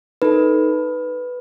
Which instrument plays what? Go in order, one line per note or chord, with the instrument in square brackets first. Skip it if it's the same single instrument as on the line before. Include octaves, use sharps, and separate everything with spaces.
[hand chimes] D#4 A4 B4